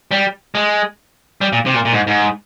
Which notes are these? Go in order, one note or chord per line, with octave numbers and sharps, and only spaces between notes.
G3
G#3
G3
A#2
C3
A#2
A#2
G#2
G#2